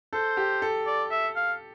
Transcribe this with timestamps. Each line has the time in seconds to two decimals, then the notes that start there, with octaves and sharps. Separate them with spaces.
0.13 A4 C5
0.37 G4
0.62 A4
0.86 D5
1.10 E5
1.36 F5